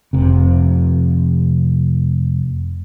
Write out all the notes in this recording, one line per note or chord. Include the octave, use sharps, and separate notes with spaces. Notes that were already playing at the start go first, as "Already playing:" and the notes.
F1 C3